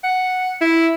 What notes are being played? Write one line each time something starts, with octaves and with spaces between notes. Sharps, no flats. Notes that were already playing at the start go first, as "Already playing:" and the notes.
F#5
E4